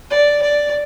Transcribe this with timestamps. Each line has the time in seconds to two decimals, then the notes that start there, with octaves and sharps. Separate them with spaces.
0.10 D5
0.42 D5